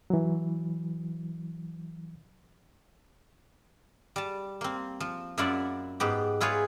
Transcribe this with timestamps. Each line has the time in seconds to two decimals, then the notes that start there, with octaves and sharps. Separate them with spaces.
0.10 E3 F#3
4.16 G3 A5
4.61 A#3 C4
5.00 F3
5.38 F#2 E4 F4 D5 E5 F#5
6.00 G#2 B3 G4
6.41 E4 F4 G#4 B4 C#5